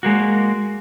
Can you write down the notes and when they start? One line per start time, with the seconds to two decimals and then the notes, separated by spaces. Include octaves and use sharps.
0.03 G#3 A#3 F#4